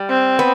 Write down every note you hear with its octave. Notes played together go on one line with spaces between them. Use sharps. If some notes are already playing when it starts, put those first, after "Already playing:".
Already playing: G3
C4
B3